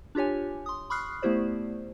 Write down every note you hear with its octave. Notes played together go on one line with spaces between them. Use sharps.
D4 F4 G4 C#5 G#5
C6 D#6
B5 C#6 D#6 F6 F#6 C7
A3 B3 E4 G4 C5 D5